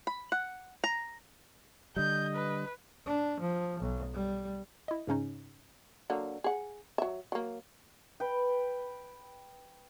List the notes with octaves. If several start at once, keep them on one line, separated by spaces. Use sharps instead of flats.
B5
F#5
A#5
D3 G3 D#5 G6
B4
D4
F3
B1
G3
E4 D#5
G#2 C#3 C#4 D#4
D3 F#3 A#3
G#4 F#5
F#3 E5
F#3 A#3
B4 G5